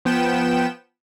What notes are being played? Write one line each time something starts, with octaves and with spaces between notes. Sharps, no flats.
F3 B3 G5 E7